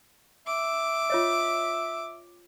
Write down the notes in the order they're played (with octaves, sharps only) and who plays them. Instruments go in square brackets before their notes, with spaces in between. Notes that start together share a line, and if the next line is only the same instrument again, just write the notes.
[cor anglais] E5 [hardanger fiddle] D6
[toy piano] F4 C#5 D#5